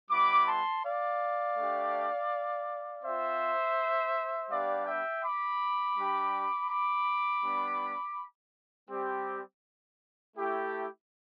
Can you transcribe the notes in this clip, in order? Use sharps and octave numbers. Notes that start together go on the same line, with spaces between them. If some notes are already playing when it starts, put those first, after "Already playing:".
G3 B3 E4 B5 D6
A5 C6
D5 F5
A3 D4 G4
C4 F4 C5 E5
G3 B3 D4 G4 D5 F5
E5 G5
B5 D6
G3 D4 G4
B5 D6
G3 B3 D4
G3 C4 G4
A3 E4 G4